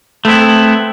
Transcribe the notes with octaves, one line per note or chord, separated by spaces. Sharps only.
A3 B3 C4 E4